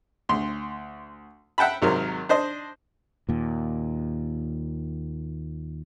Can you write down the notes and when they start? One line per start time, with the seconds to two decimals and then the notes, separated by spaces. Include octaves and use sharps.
0.29 D2 C6
1.58 E5 F#5 G5 A5 B5
1.82 G#1 C3 F#3 A#4
2.29 D4 C5 D#5
3.29 D#2 A#2